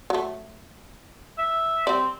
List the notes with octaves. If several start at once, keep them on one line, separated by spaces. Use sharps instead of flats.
F#3 A3
E5
G3 C4 D5